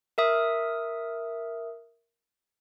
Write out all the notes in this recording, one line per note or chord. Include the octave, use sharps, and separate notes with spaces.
A#4 E5 D#6